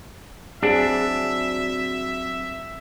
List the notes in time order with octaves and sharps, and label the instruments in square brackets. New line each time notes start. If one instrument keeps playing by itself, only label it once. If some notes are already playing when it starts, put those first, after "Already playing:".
[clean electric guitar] F#3 C4 F#4 [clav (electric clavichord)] D4 [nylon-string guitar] G#4 [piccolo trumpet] E5